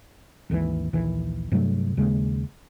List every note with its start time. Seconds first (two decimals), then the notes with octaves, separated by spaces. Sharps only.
0.50 G#1 D#2 B2 E3
0.93 A#1 D#2 E3
1.52 G2 C3 F#3 A3
1.97 D#2 C#3 G#3